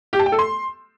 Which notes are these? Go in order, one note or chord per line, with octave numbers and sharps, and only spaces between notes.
G4
A5
G5
A4
C6